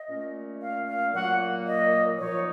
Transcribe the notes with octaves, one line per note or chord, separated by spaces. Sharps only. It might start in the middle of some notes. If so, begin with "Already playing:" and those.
Already playing: D#5
A#2 A3 C#4
F5
F5
A#2 F#3 A#3 F#5
D#5
A#2 F3 A#3 D#4 C#5